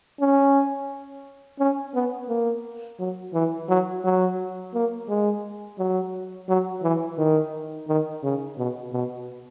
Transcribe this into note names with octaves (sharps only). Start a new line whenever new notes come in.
C#4
C#4
B3
A#3
F#3
E3
F#3
F#3
A#3
G#3
F#3
F#3
E3
D#3
D#3
C#3
B2
B2